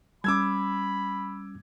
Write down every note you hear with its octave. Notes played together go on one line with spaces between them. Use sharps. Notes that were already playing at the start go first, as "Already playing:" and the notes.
G3 C#4 B5 D6 E6 G#6